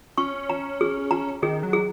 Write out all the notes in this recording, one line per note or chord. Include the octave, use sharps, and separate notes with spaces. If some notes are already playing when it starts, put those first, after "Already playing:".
C#4 C#6
A#5
G#4
A#5
D#3 G#4
F#3
G#4